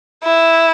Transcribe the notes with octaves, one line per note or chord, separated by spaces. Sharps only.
E4